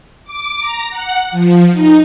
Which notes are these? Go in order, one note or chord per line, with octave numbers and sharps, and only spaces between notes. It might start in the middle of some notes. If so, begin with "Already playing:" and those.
D6
A#5
F#5
F3
D#4